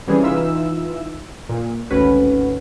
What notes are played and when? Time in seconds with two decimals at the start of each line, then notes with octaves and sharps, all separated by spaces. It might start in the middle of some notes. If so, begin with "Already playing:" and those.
0.07 C3 E3 G3 C#4 G#4
0.23 E3 D#4 F4 E5 E6
1.49 A#2
1.91 G#1 D2 C#4 F#4 B4